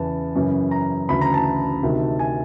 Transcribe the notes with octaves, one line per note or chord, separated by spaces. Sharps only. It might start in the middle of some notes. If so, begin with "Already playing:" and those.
Already playing: E2 C#3 E3 A5
F#2 C#3 E3
A#5
D2 C#3 E3 B5
A#5
A5
D2 C3 D#3
G#5